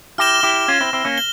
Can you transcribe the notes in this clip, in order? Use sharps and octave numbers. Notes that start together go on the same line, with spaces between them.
E4 G4 F6 A#6 E7 G7
E4 G4
C#4 F4
C4 E4
C4 E4
A#3 C#4
G7